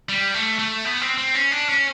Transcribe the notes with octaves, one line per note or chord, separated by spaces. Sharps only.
G3
A3
A3
B3
C4
C4
C#4
D4
C#4